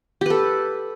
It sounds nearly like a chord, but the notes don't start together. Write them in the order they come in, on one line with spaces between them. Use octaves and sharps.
G4 B4 A4